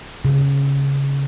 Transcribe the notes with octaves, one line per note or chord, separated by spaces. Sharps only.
C#3